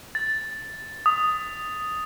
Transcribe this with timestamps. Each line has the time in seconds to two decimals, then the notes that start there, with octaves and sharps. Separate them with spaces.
0.15 A6
1.06 D#6